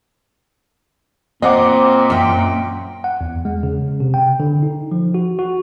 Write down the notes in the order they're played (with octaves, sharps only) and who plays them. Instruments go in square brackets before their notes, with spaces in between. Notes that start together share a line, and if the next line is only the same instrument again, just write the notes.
[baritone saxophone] A#2 [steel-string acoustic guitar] C4 [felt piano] D#5 F#5 D6
[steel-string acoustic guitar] F#2 G5
[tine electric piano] F#5
E2
G#3
C#3
C3
G5
D3
D#4
F3
F#4
F#4